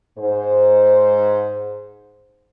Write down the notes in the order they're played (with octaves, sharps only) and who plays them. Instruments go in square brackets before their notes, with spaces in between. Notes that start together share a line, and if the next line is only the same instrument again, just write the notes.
[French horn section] G#2 C5